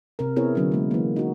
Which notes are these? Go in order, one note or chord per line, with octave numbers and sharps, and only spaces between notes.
C3 A#4
B3 C4 E4 G#4 A#4 C#5
D3 F#3 C#4
G#3 A#3
E3 A#3
D#4 F#4